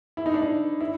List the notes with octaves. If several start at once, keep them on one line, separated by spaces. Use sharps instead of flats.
E4
D#4
D4
D#4
E4